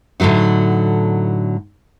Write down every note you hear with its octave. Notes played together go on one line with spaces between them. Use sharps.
A2 D3 F3 F#3 D#4